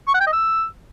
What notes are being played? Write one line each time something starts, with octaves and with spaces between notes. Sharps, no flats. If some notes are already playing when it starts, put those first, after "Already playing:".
C#6
F#5
G5
D#5
E6